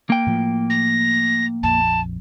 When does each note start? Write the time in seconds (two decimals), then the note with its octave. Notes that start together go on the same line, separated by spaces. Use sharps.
0.10 A#3 G5
0.27 A2 F3
0.70 A#6
1.63 A#1 F2 A5